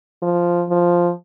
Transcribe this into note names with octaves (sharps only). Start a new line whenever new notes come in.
F3
F3